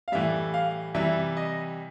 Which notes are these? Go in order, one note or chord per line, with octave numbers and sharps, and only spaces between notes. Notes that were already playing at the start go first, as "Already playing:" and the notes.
F5
A2 E3 G3 E5
F5
C3 E3 G3 E5
D#5